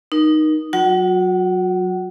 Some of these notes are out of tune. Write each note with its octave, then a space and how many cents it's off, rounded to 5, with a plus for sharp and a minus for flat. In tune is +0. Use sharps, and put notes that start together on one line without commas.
D#4 -10 A#4 +30
F#3 -5 F#4 -35 F#5 +30